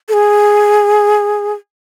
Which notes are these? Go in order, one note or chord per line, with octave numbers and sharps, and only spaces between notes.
A4
G#4